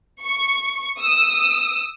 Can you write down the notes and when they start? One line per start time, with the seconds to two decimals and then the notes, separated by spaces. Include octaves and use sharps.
0.23 C#6
1.00 D#6 E6